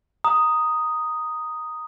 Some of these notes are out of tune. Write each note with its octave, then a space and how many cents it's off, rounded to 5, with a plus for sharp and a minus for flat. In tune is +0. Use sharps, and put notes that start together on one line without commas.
A#5 +0 D#6 +0